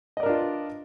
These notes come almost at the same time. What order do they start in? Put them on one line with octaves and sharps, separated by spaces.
D#5 D5 A#4 D4 F4